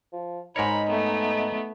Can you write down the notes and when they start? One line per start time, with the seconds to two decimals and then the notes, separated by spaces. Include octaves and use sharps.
0.12 F3
0.56 G#2 D#4 A#4 C#5 B5
0.89 A3 B3